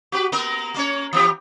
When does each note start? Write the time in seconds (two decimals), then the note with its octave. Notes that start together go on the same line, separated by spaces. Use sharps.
0.12 F#4 G4 B4
0.32 A#3 B3 A#4
0.74 A#3 C#4 C#5
1.13 E3 B3 G4